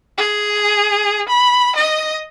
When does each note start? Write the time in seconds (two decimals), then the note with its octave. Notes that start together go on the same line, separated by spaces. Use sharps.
0.18 G#4
1.29 B5
1.75 D#5